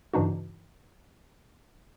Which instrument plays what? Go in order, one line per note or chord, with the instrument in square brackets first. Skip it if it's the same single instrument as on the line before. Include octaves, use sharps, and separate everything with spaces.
[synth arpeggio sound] G2 C#3 E3 D4 D#4 F#4